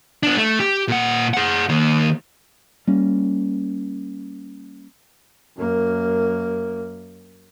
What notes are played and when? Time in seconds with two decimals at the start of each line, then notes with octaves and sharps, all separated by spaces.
0.23 B3 D4
0.37 A3
0.60 G4
0.88 A#2 F#5
1.34 G#4 F#5
1.69 D#3 A#3
2.87 G3 A#3 C#4
5.57 F#2 A#3